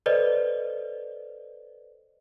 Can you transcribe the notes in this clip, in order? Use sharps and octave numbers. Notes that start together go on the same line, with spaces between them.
A4 B4 C5 D5 D#5